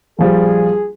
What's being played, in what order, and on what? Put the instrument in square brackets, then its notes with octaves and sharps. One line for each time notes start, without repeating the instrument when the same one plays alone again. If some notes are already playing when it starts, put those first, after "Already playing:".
[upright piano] A#1 F3 G3 [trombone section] G#4